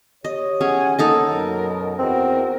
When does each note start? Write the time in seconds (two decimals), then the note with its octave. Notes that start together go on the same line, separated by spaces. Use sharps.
0.25 G4 C#5 D#5
0.61 C#4 G#4 F#5 G#5
0.99 A#3 D#4 A4 D#5 F#5
1.31 F#2 B2 A#4
1.99 E2 C4 F#4 A#4